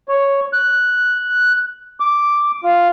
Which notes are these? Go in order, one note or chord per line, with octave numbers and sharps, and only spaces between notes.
C#5
F#6
D6
F4